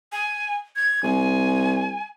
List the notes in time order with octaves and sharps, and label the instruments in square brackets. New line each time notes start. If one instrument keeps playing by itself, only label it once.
[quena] G#5
G#6
[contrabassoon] C2 [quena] G#5